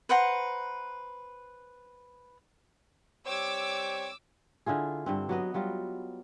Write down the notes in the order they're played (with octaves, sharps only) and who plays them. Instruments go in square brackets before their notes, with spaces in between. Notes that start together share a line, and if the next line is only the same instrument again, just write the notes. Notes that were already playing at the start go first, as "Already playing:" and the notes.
[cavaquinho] B4 C5 F#5 A#5
[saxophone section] G3 C4 C#5 [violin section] D6 E6
[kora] D3 E4 F4 G#4
G2 D3 C4
F#3 B3 D#5
F#3 G3 F4 D#5